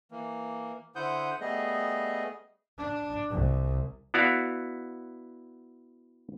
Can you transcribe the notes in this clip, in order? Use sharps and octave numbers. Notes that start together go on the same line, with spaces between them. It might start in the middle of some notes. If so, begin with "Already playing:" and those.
E3 A#3
D3 E4 C5 F#5 D#6 G6
G3 A3 B3 G#4 D#5
D4
C2
B3 E4 F#4 D5 F5